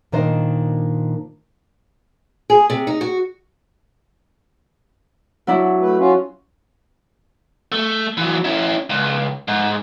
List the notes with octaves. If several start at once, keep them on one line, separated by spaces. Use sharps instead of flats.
A#2 D#3 D4 C5 D#5
G#4
C3
D#4
F#4
F#3 D4 E4
A3 B4
C#4 F4 F#4
A3
E3 F#3
C#4 E4
C#2
G#2